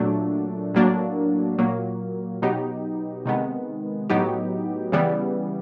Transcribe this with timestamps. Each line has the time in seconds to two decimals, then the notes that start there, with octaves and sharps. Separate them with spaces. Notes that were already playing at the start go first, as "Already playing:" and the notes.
Already playing: A#2 F#3 A3 D4
0.74 A2 F#3 A#3 D4
1.58 A#2 F#3 A#3
2.42 B2 F#3 B3 D#4 G4
3.26 C3 D#3 G#3 B3
4.10 A2 F#3 B3 D#4 G4
4.92 C#3 E3 G3 B3